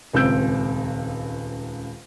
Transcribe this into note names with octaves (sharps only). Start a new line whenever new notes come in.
D#1 C#2 C4 E6 G6 D7